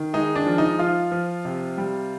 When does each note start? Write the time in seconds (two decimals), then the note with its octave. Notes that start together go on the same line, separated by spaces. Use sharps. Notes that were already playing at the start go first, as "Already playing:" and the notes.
Already playing: D#3
0.13 G#3 D#4
0.35 D4
0.47 F3
0.58 D#4
0.79 F3 F4
1.12 F3
1.45 C3
1.78 G3